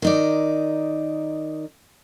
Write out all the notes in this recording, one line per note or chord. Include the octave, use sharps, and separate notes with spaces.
D#3 D#4 D5